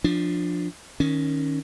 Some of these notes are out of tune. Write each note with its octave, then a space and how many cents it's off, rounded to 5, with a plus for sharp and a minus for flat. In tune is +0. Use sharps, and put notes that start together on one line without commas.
F3 +5 D4 +5
D#3 +0 C#4 +0